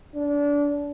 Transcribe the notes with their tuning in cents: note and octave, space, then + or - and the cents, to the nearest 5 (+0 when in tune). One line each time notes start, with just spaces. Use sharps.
D4 -25